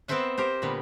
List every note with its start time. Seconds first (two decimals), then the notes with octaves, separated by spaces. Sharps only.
0.08 B3 C4 A#4 C5 E5 F#5
0.38 G4 A#4 C5
0.62 A#2 D3 G3 A#3 B3